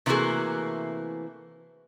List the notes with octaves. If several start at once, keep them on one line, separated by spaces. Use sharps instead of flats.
C3 E3 A3 A#3 F#4 G#4